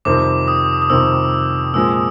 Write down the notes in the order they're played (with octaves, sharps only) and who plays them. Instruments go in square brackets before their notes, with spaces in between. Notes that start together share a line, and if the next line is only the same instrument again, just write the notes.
[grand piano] F2 C3 D#3 G3 C4 [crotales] D6
[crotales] D#6
D#6
[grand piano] F2 C3 D#3 G3 C4 [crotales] E6
[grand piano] A#2 F3 G#3 C4 [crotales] E6